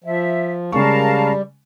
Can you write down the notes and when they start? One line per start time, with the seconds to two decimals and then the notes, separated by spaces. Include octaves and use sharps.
0.04 F3 E5
0.72 C#3 G3 G#3 A#4 F5 A5 C#6